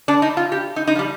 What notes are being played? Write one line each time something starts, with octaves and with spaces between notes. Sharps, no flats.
D4
D#4
F4
G4
D#4
D#4
F3
G3